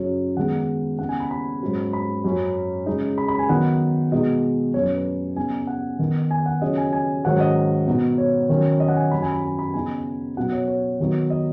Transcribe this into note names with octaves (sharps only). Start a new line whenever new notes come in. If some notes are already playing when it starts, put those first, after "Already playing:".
Already playing: F#2 C#3 F#3 C#5
D#3 G#3 B3 F#5
C#3 B3 D#4 F#5
G#5
B5
B5
G#2 F#3 C#4
B5
F#2 F#3 C#4
C#3 G#3 D#4
B5
B5
G#5
D#3 F#3 B3 D#4 F#5
B2 G#3 B3 D#4 D#5
F#2 F#3 C#4 C#5
C#5
B4
C#3 B3 D#4 G#5
F#5
D#3 B3 D#4
G#5
F#5
C#3 F#3 C#4 D#5
G#5
G#5
G#2 D#3 F#3 C#4 F#5
D#5
B2 B3 D#4
C#5
D#3 F#3 C#4
D#5
F#5
G#5
F#2 F#3 C#4 B5
G#5
B5
G#5
B5
C#3 B3 D#4 G#5
B2 F#3 B3 F#5
C#5
C#5
D#3 F#3 B3 D#4
D#5